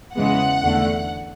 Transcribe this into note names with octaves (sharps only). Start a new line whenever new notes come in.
E2 C#3 E3 G#3 B3 F#5
E2 D3 A3